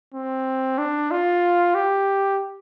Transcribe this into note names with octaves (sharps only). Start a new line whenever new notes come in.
C4
D4
F4
G4